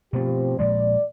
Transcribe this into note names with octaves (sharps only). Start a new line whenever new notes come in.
B2 F3 A3 C4 G4
A#2 F3 G#3 D5